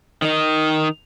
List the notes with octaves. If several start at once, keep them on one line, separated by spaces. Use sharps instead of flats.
D#3 D#4